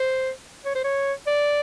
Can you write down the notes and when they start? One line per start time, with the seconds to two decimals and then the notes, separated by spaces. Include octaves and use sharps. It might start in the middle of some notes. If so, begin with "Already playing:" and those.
Already playing: C5
0.66 C#5
0.75 C5
0.84 C#5
1.27 D5